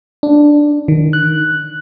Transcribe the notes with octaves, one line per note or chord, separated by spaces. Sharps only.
D4
D#3
F#6